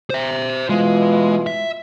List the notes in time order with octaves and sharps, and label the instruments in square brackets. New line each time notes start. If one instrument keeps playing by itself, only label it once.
[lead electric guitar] C5 E5
[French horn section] B2 E3 F4 [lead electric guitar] G#3
[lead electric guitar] E5